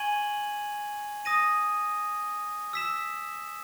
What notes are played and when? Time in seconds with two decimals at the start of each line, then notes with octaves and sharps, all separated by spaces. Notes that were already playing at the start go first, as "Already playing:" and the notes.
Already playing: G#5 C#6 G#6 D#7 F#7
1.25 D#6 A#6 D#7
2.73 E6 B6 E7